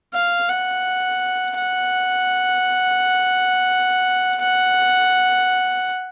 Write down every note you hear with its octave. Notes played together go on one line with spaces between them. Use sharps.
F5
F#5
F#5
F#5